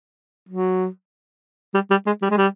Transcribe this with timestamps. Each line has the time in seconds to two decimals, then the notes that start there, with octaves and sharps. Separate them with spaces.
0.49 F#3
1.74 G3
1.90 G3
2.06 G#3
2.22 G3
2.30 G#3
2.37 G3